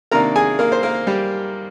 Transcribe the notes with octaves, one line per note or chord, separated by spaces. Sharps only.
C3 D#3 A#3 D4 A#4 A#5
G#4 G#5
A#3 A#4
C5
A#3 A#4
G3 G4